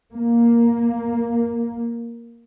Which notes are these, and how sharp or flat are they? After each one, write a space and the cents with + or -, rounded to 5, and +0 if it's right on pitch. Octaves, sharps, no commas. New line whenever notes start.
A#3 +5